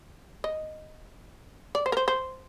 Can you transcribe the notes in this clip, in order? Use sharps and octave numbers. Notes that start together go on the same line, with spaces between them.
D#5
D5
C5
A#4
C5
C5